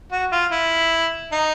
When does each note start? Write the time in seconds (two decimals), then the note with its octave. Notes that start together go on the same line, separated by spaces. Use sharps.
0.12 F#4
0.32 F4
0.52 E4
1.32 D#4